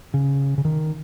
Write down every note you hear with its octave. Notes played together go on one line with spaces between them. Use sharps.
C#3
C#3
D#3